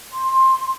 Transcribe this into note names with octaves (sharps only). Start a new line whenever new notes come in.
C6